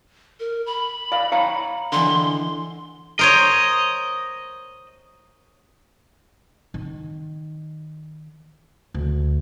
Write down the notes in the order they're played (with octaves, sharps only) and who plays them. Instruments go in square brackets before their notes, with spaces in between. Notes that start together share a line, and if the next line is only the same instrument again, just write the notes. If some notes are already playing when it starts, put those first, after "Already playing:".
[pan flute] A#4
B5
[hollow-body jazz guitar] D5 F5
C#5 F5 A#5
[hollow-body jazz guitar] D3 E3 [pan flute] C6
[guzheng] A#4 C5 C#5 [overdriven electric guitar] D#5
[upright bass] D#3
D2